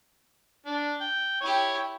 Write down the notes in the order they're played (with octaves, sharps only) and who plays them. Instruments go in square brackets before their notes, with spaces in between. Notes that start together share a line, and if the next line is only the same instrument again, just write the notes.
[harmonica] D4
G5
[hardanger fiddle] E4 G4 [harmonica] C#5